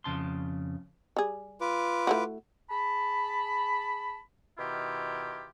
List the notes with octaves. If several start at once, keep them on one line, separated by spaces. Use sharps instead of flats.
F2 C#3 A5 C6
G3 G#4
F4 B4 D6
A3 E4 F#4
G#4 A5 B5
B2 D#3 E4 F4 G4